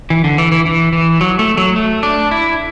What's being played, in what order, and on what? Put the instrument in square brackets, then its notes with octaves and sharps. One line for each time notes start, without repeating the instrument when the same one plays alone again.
[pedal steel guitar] E3
D3
E3
E3
E3
E3
F#3
A3
F#3
A3
D4
E4